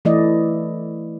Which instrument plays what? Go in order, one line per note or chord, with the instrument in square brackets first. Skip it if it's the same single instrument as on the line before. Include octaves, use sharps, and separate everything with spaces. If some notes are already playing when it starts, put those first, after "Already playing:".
[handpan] E3 A3 E4 D5 D#5